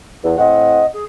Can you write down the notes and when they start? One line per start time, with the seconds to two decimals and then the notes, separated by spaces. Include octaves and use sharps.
0.24 E2
0.38 A2 C4 D#5 F#5
0.93 G#4